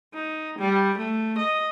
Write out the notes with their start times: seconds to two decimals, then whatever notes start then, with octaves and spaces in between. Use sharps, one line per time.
0.14 D#4
0.59 G3
0.98 A3
1.38 D#5